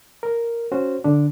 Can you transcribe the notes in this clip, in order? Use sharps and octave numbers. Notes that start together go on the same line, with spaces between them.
A#4
C#4 F#4 C5
D3 D4